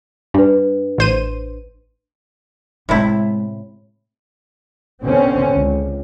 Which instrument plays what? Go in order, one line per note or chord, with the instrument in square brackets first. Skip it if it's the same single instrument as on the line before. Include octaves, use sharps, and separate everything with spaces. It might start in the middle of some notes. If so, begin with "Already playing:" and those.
[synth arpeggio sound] G2 [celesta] D4 B4
[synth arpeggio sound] A1 C5 D#7
[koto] A2 C3 E4 [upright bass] G#3 B3
[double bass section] B2 D3 C4 C#4
C#2